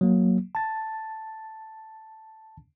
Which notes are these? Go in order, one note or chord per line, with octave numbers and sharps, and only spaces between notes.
F#3 A#3
A5 A6